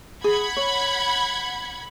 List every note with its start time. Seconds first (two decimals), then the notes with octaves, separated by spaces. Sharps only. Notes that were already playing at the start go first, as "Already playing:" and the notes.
0.24 G#4 F#5 B5 G#6
0.57 C#5